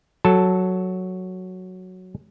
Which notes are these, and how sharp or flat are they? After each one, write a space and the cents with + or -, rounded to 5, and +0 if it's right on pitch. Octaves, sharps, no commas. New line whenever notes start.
F#3 +0 A4 +0 A5 +0